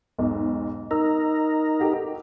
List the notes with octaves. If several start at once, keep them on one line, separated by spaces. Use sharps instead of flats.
B1 E2 G#2
D#4 A#4 E6
F#4 G4 A4